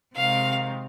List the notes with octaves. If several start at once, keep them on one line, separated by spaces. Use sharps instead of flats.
C3 D#3 G#3 F5